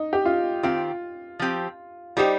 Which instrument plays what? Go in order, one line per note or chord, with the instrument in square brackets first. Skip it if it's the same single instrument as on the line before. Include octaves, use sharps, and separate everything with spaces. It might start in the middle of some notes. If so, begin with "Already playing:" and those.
Already playing: [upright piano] D#4
G4
F4
[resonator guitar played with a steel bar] D#3 C4 G4 [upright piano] F4
[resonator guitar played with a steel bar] F3 C4 G4
[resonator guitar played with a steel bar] G3 D#4 C5 [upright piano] G4